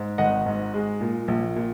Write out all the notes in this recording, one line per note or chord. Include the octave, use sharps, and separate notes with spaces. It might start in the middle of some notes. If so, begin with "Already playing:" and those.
Already playing: G#2
G#1 D#5 F#5
G#2
G#3
A#2
A#1
A#2